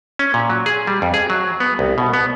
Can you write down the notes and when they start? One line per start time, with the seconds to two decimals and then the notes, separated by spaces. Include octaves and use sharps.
0.19 C#4
0.34 A#2
0.50 F#3
0.66 G#4
0.87 G3
1.02 F2
1.14 G#4
1.30 F#3
1.60 B3
1.79 C2
1.98 B2
2.14 B3